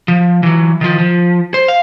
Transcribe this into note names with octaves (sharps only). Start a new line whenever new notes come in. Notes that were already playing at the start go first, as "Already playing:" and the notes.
F3
E3 F#3
D#3 F3
F3
C5
F5